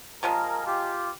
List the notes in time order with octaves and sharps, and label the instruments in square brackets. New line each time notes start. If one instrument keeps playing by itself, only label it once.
[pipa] C3 F3 G#3 [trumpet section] G#4 A#4
[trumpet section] F4 G4